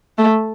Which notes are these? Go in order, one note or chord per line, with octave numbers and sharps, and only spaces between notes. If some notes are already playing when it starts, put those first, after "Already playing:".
A3